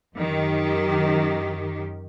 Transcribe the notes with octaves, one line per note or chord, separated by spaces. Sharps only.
F#2 D#3 G4